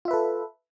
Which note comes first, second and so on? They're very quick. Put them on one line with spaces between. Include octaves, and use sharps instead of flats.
F4 E5 B4 A4